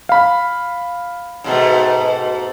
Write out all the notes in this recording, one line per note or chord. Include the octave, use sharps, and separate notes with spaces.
F5 B5
G#2 B2 A3